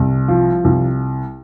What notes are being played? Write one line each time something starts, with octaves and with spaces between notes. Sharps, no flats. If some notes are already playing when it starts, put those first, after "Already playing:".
Already playing: C2
F3
C2